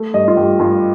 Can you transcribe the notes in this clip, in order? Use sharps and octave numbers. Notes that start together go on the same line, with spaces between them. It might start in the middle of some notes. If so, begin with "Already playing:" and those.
Already playing: A3
G2 D#5
F4
G2 G4
G2 F4